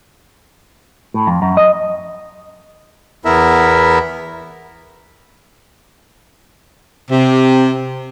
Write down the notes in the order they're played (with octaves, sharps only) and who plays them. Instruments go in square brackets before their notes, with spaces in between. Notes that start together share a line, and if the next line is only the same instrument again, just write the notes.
[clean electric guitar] A2
F2
F#2
D#5
[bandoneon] E2 B3 E4 A#4 E5
[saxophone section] C3